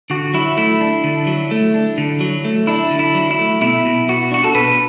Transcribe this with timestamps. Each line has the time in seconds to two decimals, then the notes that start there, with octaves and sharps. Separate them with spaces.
0.10 D3 F#4
0.34 F#3 E4
0.57 A3 E4
0.81 D4
1.04 D3
1.27 F#3
1.51 A3
1.74 D4
1.98 D3
2.21 F#3
2.45 A3
2.67 D4 E4
2.91 D3
2.99 E4
3.15 F#3
3.31 E4
3.39 A3
3.61 B2 E4
3.85 B2
4.09 B3 F#4
4.31 D4 F#4
4.44 A4
4.55 B2 B4